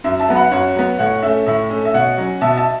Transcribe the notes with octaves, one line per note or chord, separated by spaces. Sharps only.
F#2 E5
E5 A5
F#3 B3
F#5 B5
F#2 C#5 F#5
F#3 B3
A2 C#5 F#5
A3 C#4 E5
A2 E5
A3 C#4
E5
B2 C#5 F#5
F#3 C#4
B2 E5 A5
E5 A5